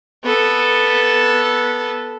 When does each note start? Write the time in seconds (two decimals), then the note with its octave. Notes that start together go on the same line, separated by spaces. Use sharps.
0.24 B3 A4